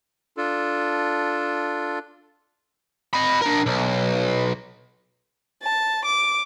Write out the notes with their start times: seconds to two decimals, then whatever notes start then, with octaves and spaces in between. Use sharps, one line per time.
0.37 D4 F4 A4
3.13 D#5 B5
3.41 D4 A#4
3.66 B1
5.63 A5
6.05 D6